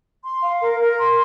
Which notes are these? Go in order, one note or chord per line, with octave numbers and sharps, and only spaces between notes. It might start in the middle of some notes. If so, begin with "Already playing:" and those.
C6
F5
A#4
A#4
C6